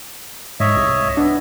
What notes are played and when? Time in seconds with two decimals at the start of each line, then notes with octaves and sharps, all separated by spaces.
0.60 G#2 C#5 D#5 E5
0.76 C2
1.17 B3 D4